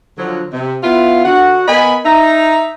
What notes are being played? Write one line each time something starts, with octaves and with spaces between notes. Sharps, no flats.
D3 F3 F#3
C3
B3 E4 F4
D3 F#4 F#5
B3 A#4 D#5 G#5 B5
D#4 E5 A#5